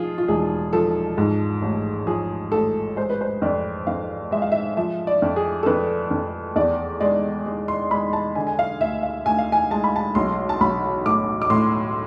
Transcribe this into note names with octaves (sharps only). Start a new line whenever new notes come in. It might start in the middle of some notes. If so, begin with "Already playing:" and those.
Already playing: F3 F4 G#4
F4
E1 G#4
F3 A4
G#2
A1
F3 G#4
A1 A4
G#3 C5
B4
C5
F2 D5
F2 F5
G#3 E5
F5
E5
F3 E5
D5
F2
G#4
A4
F2 B4
F2
E2 D5
G#3 D5
G#3
C6
G#3 B5
A5
D3 G#5
G#5
F5
D2 E5
F5
D2 G#5
F5
G#5
G#3 A5
B5
A5
B1 C6
A5
B1 B5
A2 D6
D6
A2 C6